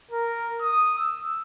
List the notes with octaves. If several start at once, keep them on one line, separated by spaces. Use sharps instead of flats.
A#4
D#6
E6